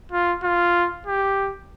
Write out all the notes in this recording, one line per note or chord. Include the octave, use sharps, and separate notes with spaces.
F4
F4
G4